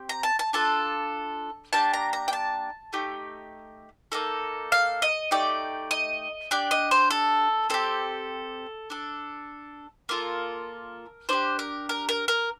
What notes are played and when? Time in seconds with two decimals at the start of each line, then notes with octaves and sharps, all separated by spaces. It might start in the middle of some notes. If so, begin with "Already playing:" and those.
Already playing: C4 G4
0.09 A#5
0.23 A5
0.39 A5
0.53 D4 F4 A4 A5
1.73 A#3 D4 G4 A5
1.93 A#5
2.13 A#5
2.28 G5
2.33 A5
2.93 A3 D#4 G4
4.12 A#3 D#4 A4
4.72 F5
5.02 D#5
5.31 A3 D#4 G4 D5
5.91 D#5
6.51 D4 G4 D5
6.71 D#5
6.91 C5
7.10 A4
7.70 C4 G4 A4
8.90 D4 A4
10.09 A#3 F4 A4 A#4
11.29 D4 G4 C5
11.59 A#4
11.89 A#4
12.09 A#4
12.28 A#4